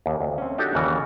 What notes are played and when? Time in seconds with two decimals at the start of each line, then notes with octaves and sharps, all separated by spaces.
0.06 D#2
0.20 D2
0.38 C4 C#4
0.58 D4 D#4 F#4 G4 A4
0.75 D#2 C#3 E3 F#4 D5